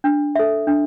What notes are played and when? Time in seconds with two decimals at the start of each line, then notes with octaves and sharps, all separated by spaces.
0.04 D4
0.35 A4 E5
0.67 D4